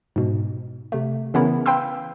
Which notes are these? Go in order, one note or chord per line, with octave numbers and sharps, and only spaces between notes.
G#2 B2
C3 A3
C#3 E3 B3 C#4 E4 A#4
B4 F5 G5 B5 C6 E6